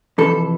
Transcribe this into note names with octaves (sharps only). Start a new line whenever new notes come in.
F2 C3 E3 A4